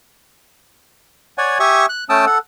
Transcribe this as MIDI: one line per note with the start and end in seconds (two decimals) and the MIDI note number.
1.38 1.58 73
1.38 1.58 74
1.38 1.58 78
1.38 1.58 80
1.60 1.86 67
1.60 1.86 76
1.60 1.86 80
1.60 1.86 85
1.60 1.86 87
1.89 2.04 90
2.09 2.25 57
2.09 2.25 61
2.09 2.25 79
2.09 2.25 81
2.09 2.25 87
2.09 2.25 88
2.26 2.38 69
2.26 2.38 78